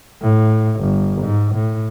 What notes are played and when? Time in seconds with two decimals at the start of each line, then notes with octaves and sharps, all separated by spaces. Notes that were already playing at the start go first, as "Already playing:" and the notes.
0.22 A2
0.80 G1
1.22 G#2
1.55 A2